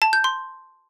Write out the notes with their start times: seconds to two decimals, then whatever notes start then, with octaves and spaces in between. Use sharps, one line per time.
0.02 A5
0.13 G6
0.24 C6